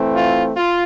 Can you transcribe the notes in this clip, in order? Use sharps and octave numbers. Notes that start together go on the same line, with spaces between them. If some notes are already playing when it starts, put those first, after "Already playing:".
Already playing: E3 A3 C4
F4
F4